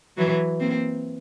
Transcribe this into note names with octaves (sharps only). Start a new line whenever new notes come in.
E3 F#3
A#3 C4